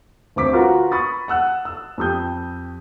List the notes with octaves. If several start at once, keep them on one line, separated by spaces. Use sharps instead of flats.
D2 C4 D6 B6
F4 F#4 A#4 B4
B5 C#6 D#6 A6
F#5 E6 F#6
E6
F2 G4 D#6 G6